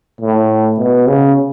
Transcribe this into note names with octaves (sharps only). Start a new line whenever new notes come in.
A2
B2
C#3